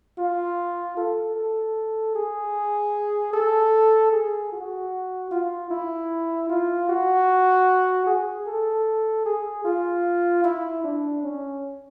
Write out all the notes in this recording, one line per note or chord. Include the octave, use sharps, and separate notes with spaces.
F4
A4
A4
G#4
A4
G#4
F#4
F4
E4
F4
F#4
G#4
A4
G#4
F4
E4
D4
C#4